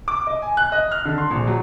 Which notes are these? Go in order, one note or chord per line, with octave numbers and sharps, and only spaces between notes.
D6
D#5
G#5
F#6
D#5
F6
D3
C6
A#1
F#3